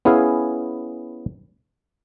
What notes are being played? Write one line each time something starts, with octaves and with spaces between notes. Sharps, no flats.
B3 C#4 E4 G#4 F5 G#5